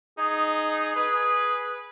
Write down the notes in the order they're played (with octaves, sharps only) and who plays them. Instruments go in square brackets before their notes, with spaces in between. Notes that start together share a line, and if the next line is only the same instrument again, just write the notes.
[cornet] D#4 [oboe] G#4
[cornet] B4